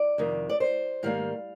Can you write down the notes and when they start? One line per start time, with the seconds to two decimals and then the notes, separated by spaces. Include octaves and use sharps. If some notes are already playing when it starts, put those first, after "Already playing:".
Already playing: D5
0.18 F2 C3 D#3
0.50 D5
0.60 C5
1.03 G#2 D#3 G3 A#3 F5